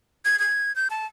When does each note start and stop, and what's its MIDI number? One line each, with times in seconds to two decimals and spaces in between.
0.25 0.39 92
0.39 0.75 92
0.76 0.88 91
0.90 1.06 81